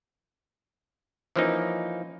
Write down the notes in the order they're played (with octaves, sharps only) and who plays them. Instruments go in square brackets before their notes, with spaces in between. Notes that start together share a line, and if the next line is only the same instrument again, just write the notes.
[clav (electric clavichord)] E3 F3 A#3 C#4 D#4